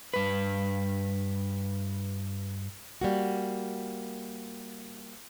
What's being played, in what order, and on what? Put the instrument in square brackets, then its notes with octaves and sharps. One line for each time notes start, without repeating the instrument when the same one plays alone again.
[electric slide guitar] G2 B4
[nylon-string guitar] G3 A#3 F#4